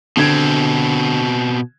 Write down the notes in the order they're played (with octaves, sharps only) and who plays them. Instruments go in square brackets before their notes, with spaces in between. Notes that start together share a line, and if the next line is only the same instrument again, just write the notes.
[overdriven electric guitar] B2 C4 [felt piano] D3 G#6